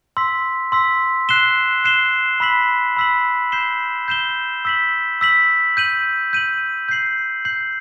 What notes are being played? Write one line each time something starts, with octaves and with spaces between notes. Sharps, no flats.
C6 E6 B6
C6 E6 B6
F#6 C7 E7 G7
F#6 C7 E7 G7
B5 E6 B6 F#7
B5 E6 B6 F#7
G6 C7 E7 G7
G6 C7 E7 G7
E6 B6 F#7
E6 B6 F#7
G6 D#7 F#7
G6 D#7 F#7
G6 C7 F#7
G6 C7 F#7